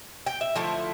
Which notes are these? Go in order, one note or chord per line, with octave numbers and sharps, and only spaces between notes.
G5
E5
D3 F3 A3 E4